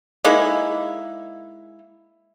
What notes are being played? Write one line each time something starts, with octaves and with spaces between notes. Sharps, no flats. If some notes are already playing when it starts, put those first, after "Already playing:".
G#3 A#3 D#4 E4